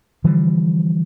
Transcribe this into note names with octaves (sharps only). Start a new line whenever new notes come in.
D3 E3 F3 G3